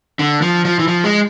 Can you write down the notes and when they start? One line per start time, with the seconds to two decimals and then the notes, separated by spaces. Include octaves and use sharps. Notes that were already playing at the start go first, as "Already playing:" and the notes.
0.19 D3
0.42 F3
0.65 F3
0.79 E3
0.88 F3
1.04 G#3